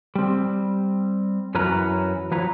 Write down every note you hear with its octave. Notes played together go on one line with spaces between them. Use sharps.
G3 C4
F#2 E3 C#4 F#4 B4 A#5
F3 F#3 B4 C#5 A#5